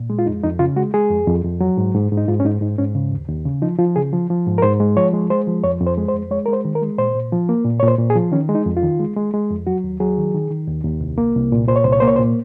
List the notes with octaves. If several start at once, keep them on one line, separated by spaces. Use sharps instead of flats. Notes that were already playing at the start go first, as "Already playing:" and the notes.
Already playing: A#2
G#3
F4
F2 D#4
F2 D#4
C#3 F4
G#3 F#4
G#3 G#4
F2
F2
F2
F#3
G#2
G#2
G#2
D#4
G#2 F4
C#4
G#2 D#4
G#2 D#4
G#2 C#4
C#3
D#2
D#2
C#3
F3 D#4
F3 F4
C#3 G#4
F3
F3
G#2
A#4
G#2 C5
G#3
F3 C#5
G#3
G#3 C5
F3
F2 C#5
F2
C5
G#3
C5
F2
G#3 C#5
A#4
G#3 C5
D#3
A#4
G#3
A#2 C5
A#2
F3
A#3
A#2
C#5
A#2
C5
A#2
G#4
F3
D#3 C#4
G#3
D#4
F2
F4
D#3
G#3
G#3
G#3
F2
F#3 F#4
D#2
F#3 G#4
D#3
D#3
D#3
D#2
D#2
C2
A#3
C2
A#2
A#2 C5
C#5
C2 C5
C#5
A#3 C5
C#5
C5
A#2